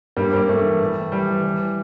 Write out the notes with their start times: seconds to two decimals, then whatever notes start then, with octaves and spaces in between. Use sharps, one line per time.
0.17 G2 G3 A#3
0.33 G2 G3 A#3
0.48 G2 A3
0.65 E3
0.81 A2
0.96 E3
1.12 E3 G3
1.28 E3
1.44 E3